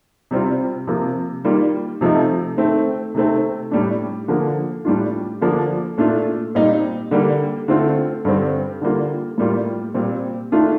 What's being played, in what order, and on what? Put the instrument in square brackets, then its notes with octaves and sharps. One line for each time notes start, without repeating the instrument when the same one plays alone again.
[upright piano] C3 G3 C4 F4
C3 F3 A#3
D#3 G3 A#3 F4
C3 F3 A3 D#4
D#3 A3 C4
C3 D#3 A3 C4
A2 G3 D4
D3 F3 A#3
A2 G3 D4 F4
D3 F3 A#3 D4
A#2 A3 D4 F4
A#2 G3 C4 D#4
D3 G3 A#3
D3 A3 C4 F4
G2 D3 G3 C4
D3 G3 A#3 F4
A2 G3 A#3 F4
A#2 G3 C4
D#3 A3 D4 F4